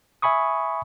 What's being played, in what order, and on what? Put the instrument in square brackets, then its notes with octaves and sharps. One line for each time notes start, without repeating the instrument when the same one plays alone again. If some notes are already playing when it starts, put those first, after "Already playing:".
[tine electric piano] E5 G#5 B5 C#6 D#6